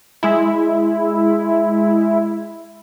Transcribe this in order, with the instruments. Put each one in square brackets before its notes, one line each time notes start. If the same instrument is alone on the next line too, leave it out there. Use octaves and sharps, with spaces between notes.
[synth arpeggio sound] G#3 E4